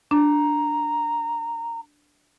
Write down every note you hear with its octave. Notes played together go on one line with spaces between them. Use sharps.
D4 A#5